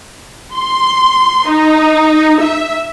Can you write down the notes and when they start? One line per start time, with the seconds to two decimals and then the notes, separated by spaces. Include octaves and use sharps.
0.54 C6
1.49 D#4
2.42 E5